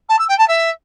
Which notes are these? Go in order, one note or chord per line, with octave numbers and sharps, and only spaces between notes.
A5
E6
G5
A5
E5